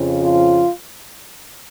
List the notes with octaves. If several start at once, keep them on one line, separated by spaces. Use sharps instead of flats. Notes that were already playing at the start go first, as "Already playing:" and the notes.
Already playing: F2 C#3 F3
F4